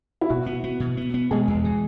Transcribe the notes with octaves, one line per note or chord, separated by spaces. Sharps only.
E4
B2 F#4
B3
B3
B2
B3
B3
B2 G#3 G#4
E2
E3